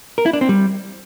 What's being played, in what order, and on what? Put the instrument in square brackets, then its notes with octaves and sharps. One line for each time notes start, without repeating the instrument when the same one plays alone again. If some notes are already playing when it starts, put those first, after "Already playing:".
[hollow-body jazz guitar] A#4
E4
D4
C4
G3